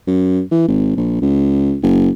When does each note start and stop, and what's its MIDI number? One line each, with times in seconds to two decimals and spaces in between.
0.07 0.41 42
0.51 0.64 52
0.68 0.93 32
0.97 1.18 34
1.22 1.77 37
1.83 2.10 30